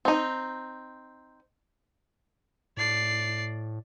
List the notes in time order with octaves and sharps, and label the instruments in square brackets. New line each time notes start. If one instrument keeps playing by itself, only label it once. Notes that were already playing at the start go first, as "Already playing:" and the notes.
[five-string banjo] C4 D#4
[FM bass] A2 [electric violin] D5 C7